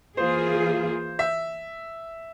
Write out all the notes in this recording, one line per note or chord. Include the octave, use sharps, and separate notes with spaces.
E3 A#3 F4 G#4 C5
E5